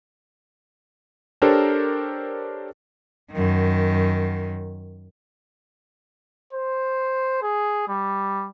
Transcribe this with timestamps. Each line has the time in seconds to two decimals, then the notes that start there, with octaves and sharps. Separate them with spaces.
1.42 D4 G4 A4 A#4 C5 C#5
3.32 F#2 D#3
6.53 C5
7.42 G#4
7.88 G3